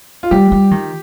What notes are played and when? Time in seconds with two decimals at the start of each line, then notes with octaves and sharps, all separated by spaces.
0.23 F4
0.31 G3 G4
0.52 G3
0.71 D#3